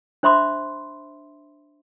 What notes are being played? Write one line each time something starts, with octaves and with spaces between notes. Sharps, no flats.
D4 C5 E5 B5 C6 D6